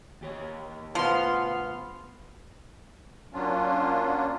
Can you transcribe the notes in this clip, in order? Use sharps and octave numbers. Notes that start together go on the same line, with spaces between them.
D#2 G4 C#5
G2 B2 F3 B3 C6 F6
F#3 A#3 C#4 D4 F4